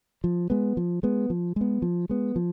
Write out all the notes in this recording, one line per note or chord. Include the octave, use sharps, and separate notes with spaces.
F3
G#3 B3
F3
G#3 B3
F3
G#3 B3
F3
G#3 B3
F3